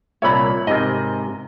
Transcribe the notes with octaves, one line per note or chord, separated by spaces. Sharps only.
C2 A#2 C#5 E5 B5
G#2 C3 A#4 D#5